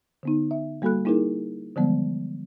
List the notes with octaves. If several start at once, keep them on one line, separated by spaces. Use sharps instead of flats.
D3 B3 D#4
E5
G3 A#3 F#4 A4 B5 F#6
A#3 D#4 E4 G#4 A#4
D3 E3 F3 G3 G#3 B3